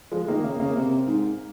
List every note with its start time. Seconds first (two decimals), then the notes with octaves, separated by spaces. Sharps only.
0.12 F3 G#3
0.22 G#3
0.28 D#3 A#3
0.44 C#3 A#3
0.60 C#3 A#3
0.76 C3 A#3
1.07 G#2